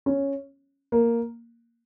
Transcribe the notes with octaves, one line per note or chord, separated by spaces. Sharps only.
C#4
A#3